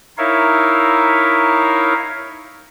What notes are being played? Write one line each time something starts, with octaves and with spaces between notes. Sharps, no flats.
D#4 E4 A#4 C#5 E5 F5